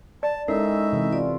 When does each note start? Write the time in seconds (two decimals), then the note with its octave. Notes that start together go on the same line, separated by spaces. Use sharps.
0.23 D5 A5
0.48 G#3 C#4 D#4 E4 A4 A#4 E5
0.92 C3 E3
1.13 F4 D5